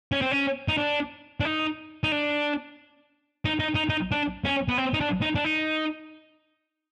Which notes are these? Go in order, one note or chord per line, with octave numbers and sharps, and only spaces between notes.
C#4
C4
C#4
D#4
D4
D4
D#4
D#4
D4
D#4
D#4
D#4
D#4
D4
C#4
B3
C4
D#4
D4
D#4
D4
D#4